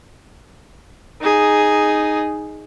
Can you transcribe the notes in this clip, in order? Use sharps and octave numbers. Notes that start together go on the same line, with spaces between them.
D#4 G#4